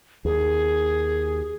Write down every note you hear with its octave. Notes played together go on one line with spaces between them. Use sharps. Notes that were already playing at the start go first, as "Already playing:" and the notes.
D#2 G#4